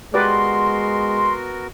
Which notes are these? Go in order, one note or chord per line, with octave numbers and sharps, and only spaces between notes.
G#3 B3 F#4 G4 A#4 B4 D5 C6